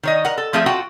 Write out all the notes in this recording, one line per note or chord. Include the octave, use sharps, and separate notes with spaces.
D#3 C#5 D#5
A#4 F#5
A4
F3 A3 C4 F4 G#4 E5
F4 F#4 F#5 G5 A5